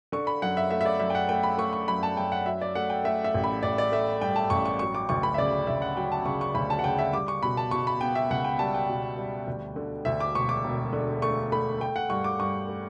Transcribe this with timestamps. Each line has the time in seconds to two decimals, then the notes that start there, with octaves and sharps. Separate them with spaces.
0.12 D3 C#6
0.27 B5
0.42 F#2 F#5
0.57 E5
0.71 A3 E5
0.81 E5
0.85 D5
1.00 F#2 E5
1.10 G5
1.15 F#5
1.29 A3 G5
1.43 B5
1.58 A3 C#6
1.73 C#6
1.88 F#2 B5
2.03 A5
2.17 F#2 G5
2.32 F#5
2.46 F#3 E5
2.61 D5
2.75 A3 F#5
2.90 G5
3.04 A3 E5
3.24 E5
3.34 A1
3.44 B5
3.63 A1 D5
3.78 D5
3.92 A3 E5
4.21 G2 G5
4.36 A5
4.50 A1 C#6
4.65 C#6
4.79 F#3 C#6
4.95 D6
5.09 D2 C#6
5.23 B5
5.34 E5
5.38 C#3 D5
5.67 D2 E5
5.82 F#5
5.96 F#3 G5
6.12 A5
6.26 C#3 C#6
6.41 C#6
6.55 D2 B5
6.70 A5
6.79 F#5
6.84 C#3 G5
6.99 E5
7.13 G3 D6
7.28 C#6
7.43 B2 B5
7.57 A5
7.71 B2 C#6
7.87 B5
8.01 B3 G5
8.15 E5
8.30 C#2 F#5
8.44 G5
8.59 G3 A5
8.74 G5
8.89 B2
9.18 G3
9.48 D2
9.76 D3
10.05 D2 E5
10.20 D6
10.35 E1 C#6
10.49 D6
10.64 E1
10.93 D3
11.22 A3 C#6
11.52 A3 B5
11.80 A3 G5
11.96 F#5
12.10 G2 C#6
12.24 D6
12.39 G2 C#6
12.68 A3